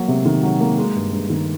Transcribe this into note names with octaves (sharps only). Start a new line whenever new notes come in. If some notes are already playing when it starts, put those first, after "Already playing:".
Already playing: F#3 A#3
C3
D#3
F#3
A#3
G#3
G2
G2
D#3